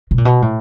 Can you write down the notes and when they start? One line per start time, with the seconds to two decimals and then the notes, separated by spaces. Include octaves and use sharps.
0.11 B2
0.18 A#2
0.25 B2
0.42 A2